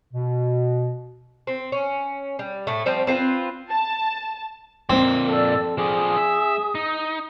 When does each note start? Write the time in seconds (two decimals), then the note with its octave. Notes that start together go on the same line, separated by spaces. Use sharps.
0.14 B2
1.47 C4
1.72 C#4
2.39 G3
2.67 A2 A3
2.86 F3 G3 C4
3.07 C4 F4 A#4 B4
3.71 A5
4.90 F2 A#2 C4
5.28 A4 D5 E6
5.78 F3 G#4 D5 D#6
6.16 E5
6.75 D#4